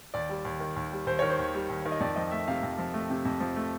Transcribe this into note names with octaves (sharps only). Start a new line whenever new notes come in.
D#2 D5
G3
D#2
D#3
D#2
G3
D#2 C5
D#3 C#5
C5
D#2
G3
D#2
D#3
D#5
F2 D5
F3 D#5
A3 E5
C3 F5
F2
F3
A3
C3
F2
F3
A3